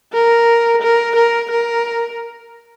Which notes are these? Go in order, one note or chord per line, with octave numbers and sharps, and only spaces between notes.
A#4
A#4
A#4
A#4